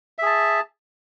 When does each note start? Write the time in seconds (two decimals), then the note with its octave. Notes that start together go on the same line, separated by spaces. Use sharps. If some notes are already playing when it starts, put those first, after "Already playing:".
0.18 E5
0.22 G#4
0.26 A5